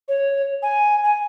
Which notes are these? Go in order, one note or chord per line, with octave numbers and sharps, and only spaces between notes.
C#5
G#5
G#5